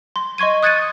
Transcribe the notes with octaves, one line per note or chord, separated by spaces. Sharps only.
C6
D#5 C6 C#6 G#6 D#7
D#6 F#6 G#6 A6 C#7 D#7